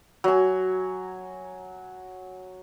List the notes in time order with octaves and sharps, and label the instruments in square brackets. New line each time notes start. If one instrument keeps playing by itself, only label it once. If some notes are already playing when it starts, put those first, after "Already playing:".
[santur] F#3 G#5